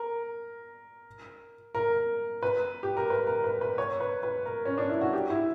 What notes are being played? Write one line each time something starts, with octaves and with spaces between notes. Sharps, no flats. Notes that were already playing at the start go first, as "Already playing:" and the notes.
Already playing: A#4
A#4
B4
G4
A#4
B4
A#4
B4
B4
C#5
B4
B4
A#4
C#4
D4
E4
F#4
G4
E4